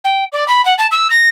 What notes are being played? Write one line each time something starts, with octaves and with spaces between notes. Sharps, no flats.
G5
D5
B5
F#5
A5
E6
A#6